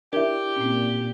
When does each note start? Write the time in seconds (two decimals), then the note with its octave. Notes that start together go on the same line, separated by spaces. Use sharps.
0.13 D4 E4 G4 A#4 E5
0.56 A#2 C4 C#4